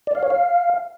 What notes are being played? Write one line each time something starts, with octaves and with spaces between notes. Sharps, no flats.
D5
F5
C#5
F5